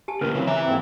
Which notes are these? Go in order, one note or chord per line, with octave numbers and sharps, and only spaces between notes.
G4 G#5 A5
D2 A#2 C#4 A#4 B4
C#3 E3 F#3 C4
E3 E5 G#5 A#5 D6 F#6
D#2 G#2 C4